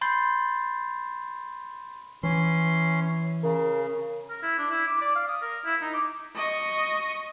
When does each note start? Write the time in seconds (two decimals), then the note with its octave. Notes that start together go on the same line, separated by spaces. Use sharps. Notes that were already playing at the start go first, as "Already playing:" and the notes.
0.01 B5 C6 G6 A6 C7
2.23 E3 C#4 C6
3.44 C#3 A#4
4.30 A#4
4.42 E4
4.58 D4
4.70 E4
4.87 D6
5.01 D5
5.15 F5
5.28 D#6
5.42 A#4
5.65 E4
5.81 D#4
5.94 D6
6.35 D#5 C#6